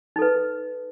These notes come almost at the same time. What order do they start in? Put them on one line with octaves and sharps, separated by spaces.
D#4 A4 B4